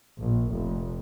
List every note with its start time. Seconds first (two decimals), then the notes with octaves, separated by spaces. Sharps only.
0.18 A#1
0.52 F1